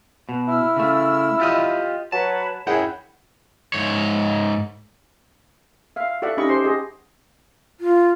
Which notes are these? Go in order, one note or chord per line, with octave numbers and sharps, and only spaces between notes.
B2
E4 E6 F6
C#3 A3
F4 G4 D#5
F#3 B4 C#5 A5
F#2 E4 G#4 F#5 G5 B5
G#2 C#5
E5 F5
F#4 A4 D5 E5 F#5
C#4 D#4 G4 D#5 B5 C#6
G4 C5 C6
F#4 G#4 D#5
F4